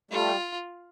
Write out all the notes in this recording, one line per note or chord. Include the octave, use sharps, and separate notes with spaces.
G3 A3 F4